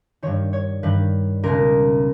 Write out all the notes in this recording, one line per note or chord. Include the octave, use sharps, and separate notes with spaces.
G2 D#3 C#5
C#5
G2 D#3 B4
C#2 B2 A#4